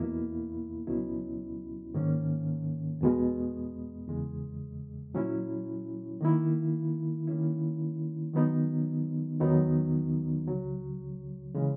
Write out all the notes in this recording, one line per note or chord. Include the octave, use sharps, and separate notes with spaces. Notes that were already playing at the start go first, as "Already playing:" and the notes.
Already playing: E2 B2 A#3 E4
C#2 B2 F#3 C#4 E4
G#2 D#3 A#3 C#4
E2 B2 G#3
E2 C#3 G#3
A#2 F#3 C#4 E4
D#3 A#3 E4
D#3 A#3 C#4 E4
D#3 F#3 B3 D#4
E2 D#3 F#3 B3 D#4
C#2 C#3 F#3
C#3 E3 G#3